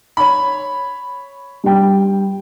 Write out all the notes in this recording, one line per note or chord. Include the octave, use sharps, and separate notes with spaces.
C#5 B5
G2 G5